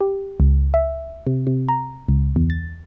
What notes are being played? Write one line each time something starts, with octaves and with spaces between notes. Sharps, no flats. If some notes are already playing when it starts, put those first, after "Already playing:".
G4
C#2
E5
C3
C3
A#5
C#2
E2
A6